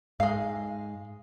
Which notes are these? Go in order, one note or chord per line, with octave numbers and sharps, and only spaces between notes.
G#2 G#3 F5